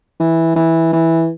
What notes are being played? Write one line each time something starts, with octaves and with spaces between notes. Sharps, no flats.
E3
E3
E3